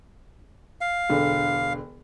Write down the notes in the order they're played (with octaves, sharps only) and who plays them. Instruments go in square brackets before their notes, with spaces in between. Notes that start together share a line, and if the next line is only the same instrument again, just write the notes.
[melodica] F5
[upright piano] E1 D3